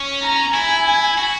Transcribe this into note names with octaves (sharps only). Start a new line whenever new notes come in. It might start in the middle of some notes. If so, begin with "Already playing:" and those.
Already playing: C#4
A#5
E4 G#5
F#4